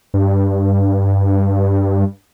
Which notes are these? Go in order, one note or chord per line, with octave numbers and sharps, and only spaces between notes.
G2